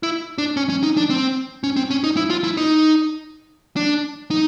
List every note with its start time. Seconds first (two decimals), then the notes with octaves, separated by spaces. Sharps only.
0.03 E4
0.38 D4
0.57 C#4
0.70 C#4
0.83 D#4
0.97 D4
1.10 C4
1.64 C#4
1.76 C4
1.90 C#4
2.04 D#4
2.17 E4
2.30 F4
2.44 E4
2.57 D#4
3.76 D4
4.31 D#4